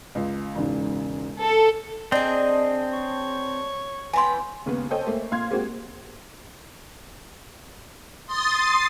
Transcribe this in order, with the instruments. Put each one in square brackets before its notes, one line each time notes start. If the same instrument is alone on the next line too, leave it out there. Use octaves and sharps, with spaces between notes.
[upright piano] C#2
E1 G#2 C#3
[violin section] A4
[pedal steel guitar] C4 [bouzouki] D4 G#4 [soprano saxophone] D#5
[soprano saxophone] C#5
[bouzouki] E3 B3 G5 [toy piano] G#5 C6
[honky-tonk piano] D#2 C#3 G#3 B3
A4 C5 C#5 D#5 G5 G#5
A3 A#3
A#2 F5 C6 G#6
G#3 A#3 C4 F#4 G4
[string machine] C6 D#6 A6